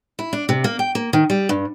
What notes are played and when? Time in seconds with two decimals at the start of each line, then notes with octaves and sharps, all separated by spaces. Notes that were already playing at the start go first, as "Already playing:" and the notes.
0.19 E4
0.33 D4
0.49 C3
0.64 A#3
0.79 G5
0.95 A#3
1.13 D#3
1.30 G3
1.49 G2